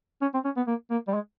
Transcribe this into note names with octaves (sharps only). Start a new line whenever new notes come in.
C#4
C4
C#4
B3
A#3
A#3
G3
G#3